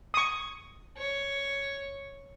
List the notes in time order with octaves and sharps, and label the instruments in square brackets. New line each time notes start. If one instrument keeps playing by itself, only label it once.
[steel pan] C#6 D#6
[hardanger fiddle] C#5